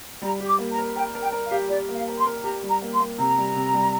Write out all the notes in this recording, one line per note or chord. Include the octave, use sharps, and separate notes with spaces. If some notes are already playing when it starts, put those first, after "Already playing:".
G3 A#5
G4
D6
A#3
A#5
A#4
A#4 G5
A#4
G5
A#4
F5
G4
G4 D5
A#3
F5
A#4
C6
A#4
G4 A#5
G3
A#5
A#3
C6
A#3
C3 A#5
G3
C3
G3